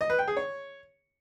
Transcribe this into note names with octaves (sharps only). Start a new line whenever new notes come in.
D#5
B4
G5
G#4
C#5